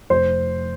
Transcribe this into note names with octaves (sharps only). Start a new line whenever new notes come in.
F1 C5